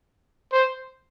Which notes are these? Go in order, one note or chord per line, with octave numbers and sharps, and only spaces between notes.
C5